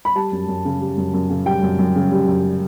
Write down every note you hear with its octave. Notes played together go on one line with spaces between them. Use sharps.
B5
G3 A5
F#2
F#2
C#3
G3
F#2
F#2
C#3
G3 G5
F#2
F#2
C#3
G3
F#2